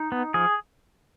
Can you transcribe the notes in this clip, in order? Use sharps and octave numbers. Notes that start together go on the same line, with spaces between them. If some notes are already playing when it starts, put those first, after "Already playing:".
Already playing: D#4
B3
F3 G#4